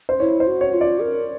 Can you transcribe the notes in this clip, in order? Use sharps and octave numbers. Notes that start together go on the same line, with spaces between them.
C5
E4 C#5
C5
F#4
C#5
F4
D5
A#4